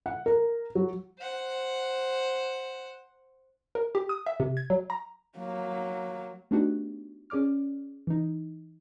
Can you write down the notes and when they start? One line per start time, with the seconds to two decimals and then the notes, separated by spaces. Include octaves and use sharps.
0.06 F#5
0.26 A#4
0.75 F#3
1.19 C5 F#5
3.75 A#4
3.95 G4
4.09 D#6
4.26 E5
4.40 C3
4.57 G#6
4.70 F#3
4.90 A#5
5.38 F#3 A#3
6.51 A3 B3 D4 D#4 F#4 G4
7.30 C#4 G#4 D5 D6 F6
8.07 E3 D#4